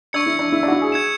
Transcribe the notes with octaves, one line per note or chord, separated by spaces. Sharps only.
D4 C#6 E6 G#6 C#7
E4
D4
E4
D4
F#4
E4
G#4
G#6 C#7 E7